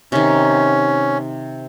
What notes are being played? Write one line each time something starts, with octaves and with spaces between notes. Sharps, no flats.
C3 D#3 C#4